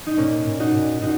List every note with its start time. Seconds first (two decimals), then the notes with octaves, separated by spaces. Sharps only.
0.07 D#4
0.17 A#2 A#3 C#4
0.47 A#2
0.60 D#4 F#4
0.74 A#2
1.02 A#2 D#4 F#4